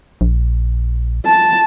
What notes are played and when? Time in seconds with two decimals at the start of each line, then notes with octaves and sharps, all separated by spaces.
0.21 A#1
1.26 A5